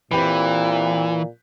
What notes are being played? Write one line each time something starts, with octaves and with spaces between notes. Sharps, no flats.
A#2 E3 C4 G4 B4